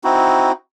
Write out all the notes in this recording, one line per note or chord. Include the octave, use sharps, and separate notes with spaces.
C4 D#4 E4 F#4